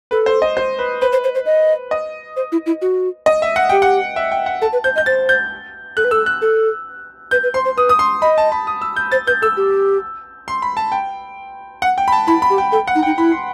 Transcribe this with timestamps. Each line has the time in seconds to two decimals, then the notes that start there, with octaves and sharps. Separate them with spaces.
0.11 A4 B4
0.26 C5
0.42 D#5
0.57 C5
0.79 B4
1.02 B4 C5
1.12 C5
1.24 C5
1.35 C5
1.46 D#5
1.91 D#5
2.36 C5
2.52 E4
2.66 E4
2.82 F#4
3.26 D#5
3.42 E5
3.56 F#5
3.69 G4 G5
3.82 F#5
4.16 E5
4.32 G5
4.46 F#5
4.62 A4 A5
4.73 B4
4.84 C5 G6
4.96 D#5 G6
5.06 C5 A6
5.29 G6
5.97 A4 F#6
6.04 B4
6.11 A4 E6
6.26 F#6
6.42 A4
7.31 B4 G6
7.43 B4
7.54 C5 C6
7.65 C5
7.77 B4 D#6
7.89 D#6
7.99 C6
8.22 D#5 B5
8.38 A5
8.52 B5
8.67 D#6
8.81 E6
8.96 G6
9.12 C5 A6
9.27 B4 G6
9.42 A4 E6
9.57 G4
10.48 C6
10.62 B5
10.77 A5
10.92 G5
11.82 F#5
11.98 G5
12.08 B5
12.12 A5
12.27 E4 B5
12.42 B5
12.50 G4
12.58 G5
12.72 A4 G5
12.87 F#5
12.95 D#4
13.03 G5
13.06 D#4
13.18 E4 B5
13.32 C6